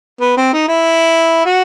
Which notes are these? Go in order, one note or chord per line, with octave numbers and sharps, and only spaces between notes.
B3
C4
D#4
E4
F#4